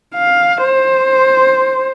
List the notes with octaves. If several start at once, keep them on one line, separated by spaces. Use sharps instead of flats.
F5
C5